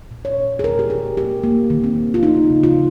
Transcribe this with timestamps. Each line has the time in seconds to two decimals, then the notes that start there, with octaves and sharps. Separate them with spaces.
0.11 A#2
0.25 C#5
0.37 A#2
0.59 G#4
0.64 D#3 A#4
0.79 G4
0.90 D#3 G#4
1.17 A#3 G4
1.43 A#3
1.70 D#3
1.84 C4
1.96 D#3
2.14 F4
2.23 C#3 D#4
2.50 C#3
2.63 F4